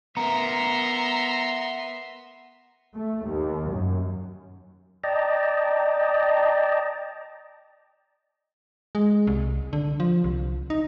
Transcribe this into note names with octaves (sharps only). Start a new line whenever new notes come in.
B3 A#4 E5 A#5 C6
A3
D#2
F#2
D5 D#5 G5 A5 A#5
G#3
C2
D3
F3
C2
D#4